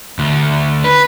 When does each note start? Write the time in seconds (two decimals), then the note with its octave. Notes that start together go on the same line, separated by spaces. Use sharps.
0.19 D2
0.84 B4